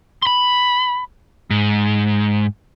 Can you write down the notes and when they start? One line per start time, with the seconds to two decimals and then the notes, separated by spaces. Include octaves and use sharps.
0.22 B5 C6
1.50 G#2